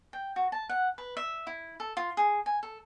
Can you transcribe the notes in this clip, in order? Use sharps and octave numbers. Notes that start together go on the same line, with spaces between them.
G5
F#4
A5
F#5
B4
E5
E4
A4
F4
G#4
G#5
A4